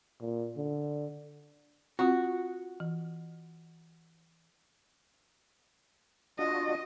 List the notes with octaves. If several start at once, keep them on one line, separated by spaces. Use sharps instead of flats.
A#2
D3
C4 F4 F#4
E3
D4 F4 F#4 D#5